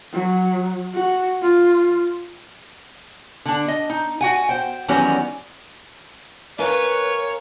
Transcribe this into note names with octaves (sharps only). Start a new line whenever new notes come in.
F#3
F#4
F4
D3 D4
D#5
D#4
F#4 F#5 G#5
C5 G5
D#3 E3 F#3 G3 B3 C#4
A#4 B4 C#5 F5 G#5